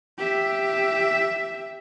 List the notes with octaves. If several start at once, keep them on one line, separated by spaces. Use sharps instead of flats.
G4 E5